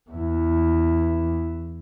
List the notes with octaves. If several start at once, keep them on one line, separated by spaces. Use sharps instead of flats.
E2 E4